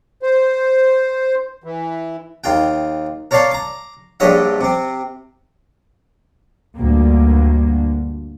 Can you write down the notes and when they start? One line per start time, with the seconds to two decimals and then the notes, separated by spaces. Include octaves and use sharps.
0.22 C5
1.64 E3
2.44 D#2 F4 G5
3.31 A#4 C#5 D5 F5 A5 C6
3.51 A#5 D6
4.20 A#1 G2 D3 C#5 D#5 E5
4.61 C3 C4
6.76 D2 G2 D3 G3 A#3